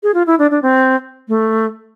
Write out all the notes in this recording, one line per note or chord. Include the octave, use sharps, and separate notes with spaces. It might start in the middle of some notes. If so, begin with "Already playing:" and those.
G#4
F4
E4
D4
D4
C4
A3